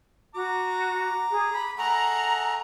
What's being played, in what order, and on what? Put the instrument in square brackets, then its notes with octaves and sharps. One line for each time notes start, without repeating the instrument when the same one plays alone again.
[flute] F#4 [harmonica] A#5 D6
[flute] G#4
B5
[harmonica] A3 G#4 F#5 [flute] A#5